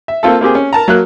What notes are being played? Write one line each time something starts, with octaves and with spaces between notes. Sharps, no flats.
E5
A#3 C4 F4 A4
A#3 C4 G4 G#4
C#4
A#4 A5 A#5
F#3 A#3 F#6